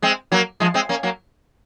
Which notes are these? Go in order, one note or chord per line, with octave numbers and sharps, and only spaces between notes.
G#3 C4
F#3 A#3
F3 G#3
G#3 C4
A#3 C#4
F#3 A#3